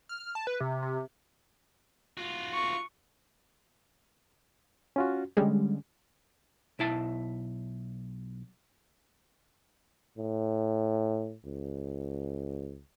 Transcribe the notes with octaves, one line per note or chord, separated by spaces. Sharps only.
F6
A5
B4
C3
C3
F4 F#4
C#6
C#4 F4 F#4
D3 G3 G#3 C#4
B1 E4 A5
A2
C#2